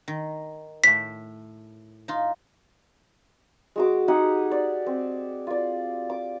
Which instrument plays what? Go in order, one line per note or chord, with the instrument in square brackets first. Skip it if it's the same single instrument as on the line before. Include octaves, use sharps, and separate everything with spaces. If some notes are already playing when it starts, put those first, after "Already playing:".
[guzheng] D#3
[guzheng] A2 A3 [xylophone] B6
[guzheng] D#4 F4
[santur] G#3 F#4 D6
D#4 G4 G#4 F#5
D5
C4
F4 D5
D6